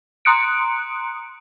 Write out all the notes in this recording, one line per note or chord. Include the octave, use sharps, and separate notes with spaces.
A#5 C6 D#6 F#6 C#7 D7